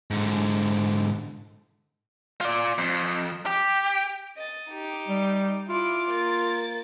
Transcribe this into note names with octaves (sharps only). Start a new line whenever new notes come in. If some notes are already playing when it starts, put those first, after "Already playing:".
G#2 D3
F4 D5
F2
G4
D#5 A6
D#4 G4
G3
E4 F4 D6
A#3 A6